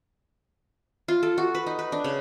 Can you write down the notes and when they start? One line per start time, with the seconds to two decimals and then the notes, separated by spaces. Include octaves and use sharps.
1.08 F4
1.23 A4
1.38 F#4
1.55 B4
1.66 D#4
1.79 B4
1.92 D4
2.04 C#3